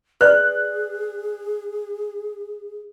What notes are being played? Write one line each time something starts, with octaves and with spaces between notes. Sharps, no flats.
G#4 B4 D5 F#6